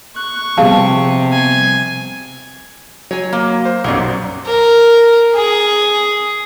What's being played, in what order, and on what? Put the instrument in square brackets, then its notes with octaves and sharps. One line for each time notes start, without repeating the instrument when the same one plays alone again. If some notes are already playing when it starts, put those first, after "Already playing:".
[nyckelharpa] C#6 [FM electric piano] F#6
[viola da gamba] C3 [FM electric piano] F3 G3 B3 [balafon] G#4 F5 A5
[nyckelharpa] G#5
[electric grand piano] F#3 [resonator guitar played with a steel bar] C#5 G#5
[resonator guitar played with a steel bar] A#3
[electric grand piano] C5
[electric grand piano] B1 F#2 [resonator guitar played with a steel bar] F#3 G3 D5
[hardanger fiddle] A#4
G#4